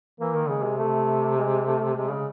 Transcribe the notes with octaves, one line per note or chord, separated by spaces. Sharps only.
E3 A#3
D#3
C#3 G#3
C3
A3
G#3
A3
C3 G#3
C#3